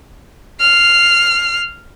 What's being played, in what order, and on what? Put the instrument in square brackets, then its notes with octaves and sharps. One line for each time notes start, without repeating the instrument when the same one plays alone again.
[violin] F6 C7